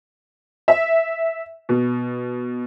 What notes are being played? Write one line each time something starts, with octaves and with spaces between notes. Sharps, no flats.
E5
B2